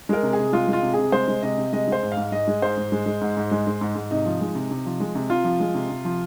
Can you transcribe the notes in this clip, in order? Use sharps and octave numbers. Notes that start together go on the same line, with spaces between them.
G#3 A#4
C3
G#4
C3
G#3 F4
G#3
F4
C3
C3 G#4
G#3 C5
G#3
C3 D#5
C3
G#3 D#5
G#3 C5
G#2
F5
G#2
G#3 D#5
G#3
G#2 C5
G#2
G#3
G#3
G#2
G#2
G#3
G#3
G#2
G#2
C3 D#4
F3
G#3
C3
C3
F3
G#3
C3
C3 F4
F3
G#3
C3
C3
F3